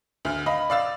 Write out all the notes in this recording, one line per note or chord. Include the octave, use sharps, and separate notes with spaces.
D2 F6
D#5 F5 B5
D5 F5 E6 A6